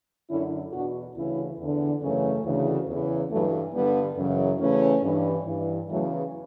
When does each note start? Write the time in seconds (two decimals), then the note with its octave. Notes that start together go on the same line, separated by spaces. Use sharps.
0.30 F#2 D3 C#4 E4
0.73 E2 B2 D4 F#4
1.16 D2 C#3 E3 C#4 E4
1.59 E2 D3
2.02 F#2 C#3 E3 A3 C#4
2.45 D2 C#3 E3
2.88 E2 C#3 E3
3.31 G2 E3 F#3 A3
3.74 G2 G3 B3
3.79 D3
4.17 F#2 C#3 E3
4.60 E2 C#3 E3 A3 C#4
5.03 G2 E3
5.46 G2 E3
5.89 E2 C#3 E3 F#3 A3